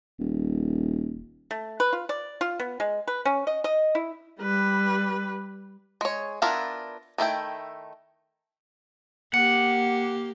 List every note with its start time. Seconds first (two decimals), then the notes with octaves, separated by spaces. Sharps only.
0.19 D#1
1.51 A3
1.80 B4
1.93 F4
2.09 D5
2.41 F4
2.60 B3
2.80 G#3
3.07 B4
3.25 C#4
3.47 D#5
3.64 D#5
3.95 E4
4.40 G3 B4
6.01 G#3 C#5
6.42 B3 D4 E4 F4 A#4
7.18 D#3 A3 E4 G5
9.34 A#3 G4 F#5 C#7